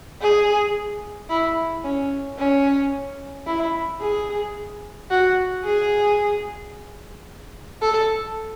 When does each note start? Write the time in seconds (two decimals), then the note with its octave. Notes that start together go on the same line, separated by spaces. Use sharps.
0.21 G#4
1.30 E4
1.84 C#4
2.38 C#4
3.47 E4
4.01 G#4
5.11 F#4
5.65 G#4
7.82 A4